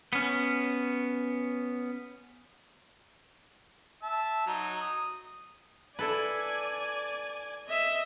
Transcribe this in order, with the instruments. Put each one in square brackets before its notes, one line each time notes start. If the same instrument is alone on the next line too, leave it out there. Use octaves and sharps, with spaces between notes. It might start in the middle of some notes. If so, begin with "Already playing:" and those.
[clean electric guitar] B3 C#4
[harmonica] E5 A5
F#3 D#4
D#6
[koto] E4 A4 B4 [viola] D5 G#5
[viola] D#5 E5